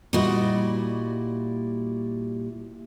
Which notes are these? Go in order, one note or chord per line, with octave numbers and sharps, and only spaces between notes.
A#2 G3 E4 F#4 D#5